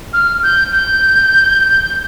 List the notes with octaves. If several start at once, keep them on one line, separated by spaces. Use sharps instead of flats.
F6
G6
G6